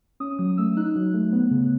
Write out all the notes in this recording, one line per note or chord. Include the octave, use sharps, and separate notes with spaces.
C#4 D#6
F#3 D#6
A3 E6
D#4 F#6
F#3
A3
B3
C#3